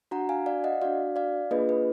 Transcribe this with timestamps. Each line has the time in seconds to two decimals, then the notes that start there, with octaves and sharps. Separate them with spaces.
0.11 D4 F#4 F#5 A#5
0.29 F5 G#5
0.46 D5 F5
0.64 D#5 F#5
0.82 D4 F#4 D5 F5
1.16 D5 F5
1.51 A#3 D4 F4 G#4 B4 D#5
1.69 B4